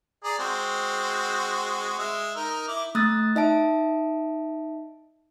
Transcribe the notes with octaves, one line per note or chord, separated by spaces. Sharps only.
G#4 D5 A#5
G#3 C4 F#4
G#3 E5
D#4 A#4
E4 D6
A3 D#6 E6 F#6 A6
D#4 D#5 E5 A5 D7